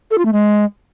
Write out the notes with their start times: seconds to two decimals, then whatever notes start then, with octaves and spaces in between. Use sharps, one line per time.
0.11 A4
0.18 F4
0.25 A3
0.33 G#3